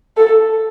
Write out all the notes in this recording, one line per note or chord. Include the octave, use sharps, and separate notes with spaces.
A4